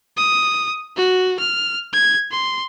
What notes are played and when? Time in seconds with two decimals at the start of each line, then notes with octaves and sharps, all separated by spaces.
0.17 D#6
0.97 F#4
1.40 F6
1.93 G#6
2.31 C6